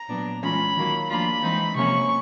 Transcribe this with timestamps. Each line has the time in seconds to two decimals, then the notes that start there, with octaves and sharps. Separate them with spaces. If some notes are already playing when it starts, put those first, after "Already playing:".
Already playing: A#5
0.09 A#2 F#3 B3 D4
0.42 E3 G#3 C#4 F4 B5
0.76 D#3 F#3 A#3
1.09 F3 A#3 D4 F4 B5
1.42 E3 G#3 C4 D#4
1.76 C3 F3 A#3 C#4 C#6